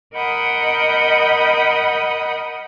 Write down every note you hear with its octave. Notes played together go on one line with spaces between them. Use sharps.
A#4 D#5 F#5 B5 D#6 G6